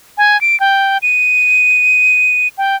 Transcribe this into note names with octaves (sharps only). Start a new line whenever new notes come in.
G#5
D7
G5
D#7
G5